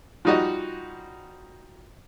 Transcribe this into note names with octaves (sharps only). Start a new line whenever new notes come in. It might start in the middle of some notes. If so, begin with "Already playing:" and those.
F3 G3 D#4 F#4 D#5